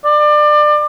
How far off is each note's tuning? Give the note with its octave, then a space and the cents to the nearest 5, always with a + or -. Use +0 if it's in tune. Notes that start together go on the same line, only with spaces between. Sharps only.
D5 +25